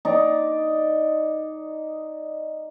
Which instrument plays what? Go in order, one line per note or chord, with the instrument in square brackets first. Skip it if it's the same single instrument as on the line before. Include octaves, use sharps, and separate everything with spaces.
[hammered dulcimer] D#4 D5